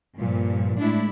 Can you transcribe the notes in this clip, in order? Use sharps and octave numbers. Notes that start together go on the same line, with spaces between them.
G2 A#2 F3
A2 G#3 D4 E4